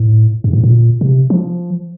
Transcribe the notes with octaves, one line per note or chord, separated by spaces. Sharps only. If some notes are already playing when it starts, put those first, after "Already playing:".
Already playing: A2
G2
A2
A#2
C3
F3